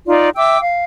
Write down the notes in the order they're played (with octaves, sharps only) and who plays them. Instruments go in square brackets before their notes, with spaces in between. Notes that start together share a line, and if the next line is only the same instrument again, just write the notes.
[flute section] D#4 F4 D5
E5 G5 D6 E6
F5